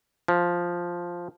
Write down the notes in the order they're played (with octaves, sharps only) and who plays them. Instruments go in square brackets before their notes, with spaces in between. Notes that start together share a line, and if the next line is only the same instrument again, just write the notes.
[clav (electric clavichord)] F3